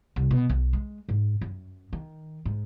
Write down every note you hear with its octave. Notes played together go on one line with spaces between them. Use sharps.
C2
B2
B1
G#3
G#2
F#2
D#3
G#2